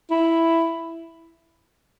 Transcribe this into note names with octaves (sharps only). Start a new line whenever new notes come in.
E4